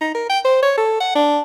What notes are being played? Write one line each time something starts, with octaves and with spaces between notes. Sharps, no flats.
D#4
A#4
G5
C5
C#5
A4
F#5
D4